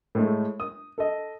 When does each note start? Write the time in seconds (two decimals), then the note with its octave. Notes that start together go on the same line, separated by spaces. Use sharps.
0.15 A2 G#3 A3
0.60 D#6
0.98 A4 D#5